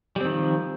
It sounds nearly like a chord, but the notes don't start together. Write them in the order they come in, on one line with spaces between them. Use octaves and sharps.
G3 C4 D#3 F3